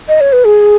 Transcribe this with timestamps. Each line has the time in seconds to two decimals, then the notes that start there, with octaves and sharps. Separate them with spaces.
0.08 D#5
0.21 C#5
0.33 B4
0.45 G#4